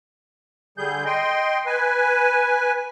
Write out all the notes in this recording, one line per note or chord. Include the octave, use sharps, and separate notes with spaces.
D3 G3 G#4 G6
D#5 G5 C6
B4 G#5